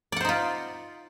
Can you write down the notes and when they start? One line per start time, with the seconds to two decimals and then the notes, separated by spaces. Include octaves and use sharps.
0.12 D5
0.16 F#5
0.21 C5
0.25 D#4
0.29 F4